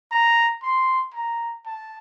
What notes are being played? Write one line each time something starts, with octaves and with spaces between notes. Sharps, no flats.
A#5
C6
A#5
A5